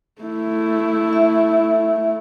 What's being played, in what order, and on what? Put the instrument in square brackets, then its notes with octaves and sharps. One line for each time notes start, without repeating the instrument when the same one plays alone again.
[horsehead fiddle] A3 E4
[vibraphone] E5